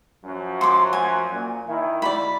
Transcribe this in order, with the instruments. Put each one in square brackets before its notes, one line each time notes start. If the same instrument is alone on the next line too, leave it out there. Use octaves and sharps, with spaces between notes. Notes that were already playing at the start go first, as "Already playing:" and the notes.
[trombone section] F#2 F3 F#3
[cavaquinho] C6 D6
G#5
[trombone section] A#2
D#3 E4
[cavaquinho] D5 B5